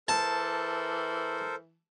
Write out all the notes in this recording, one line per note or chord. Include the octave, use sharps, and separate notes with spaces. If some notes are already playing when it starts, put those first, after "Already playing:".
E3 A4 A#4 C5 A5